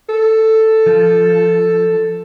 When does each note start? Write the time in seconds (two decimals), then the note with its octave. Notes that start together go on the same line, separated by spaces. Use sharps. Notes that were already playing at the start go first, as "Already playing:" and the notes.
0.09 A4
0.86 F3